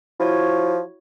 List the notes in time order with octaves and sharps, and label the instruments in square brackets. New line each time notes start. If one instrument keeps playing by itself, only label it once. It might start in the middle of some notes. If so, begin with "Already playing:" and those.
[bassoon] F3 [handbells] E4 F#4 C#5